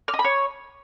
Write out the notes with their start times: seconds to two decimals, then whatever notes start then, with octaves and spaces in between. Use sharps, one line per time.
0.08 F6
0.14 D#5
0.19 B5
0.24 C#5